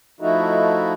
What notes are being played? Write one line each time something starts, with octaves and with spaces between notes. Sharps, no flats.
F3 A3 D#4 E4 F#4